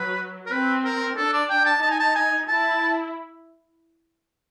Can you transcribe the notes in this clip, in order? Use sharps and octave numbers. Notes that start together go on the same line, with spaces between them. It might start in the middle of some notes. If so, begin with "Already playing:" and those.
Already playing: F#3 B4
A#4
C4 B4
A#4
D4 A4
D5
G5
A5
D#4 A5
G#5
A5
G#5
E4 A5